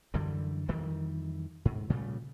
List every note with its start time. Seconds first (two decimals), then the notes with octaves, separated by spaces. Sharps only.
0.14 F#2 D3 E3 G3
0.68 F2 D#3 E3 G3
1.65 G#2
1.90 A#2 C#3 G3 A3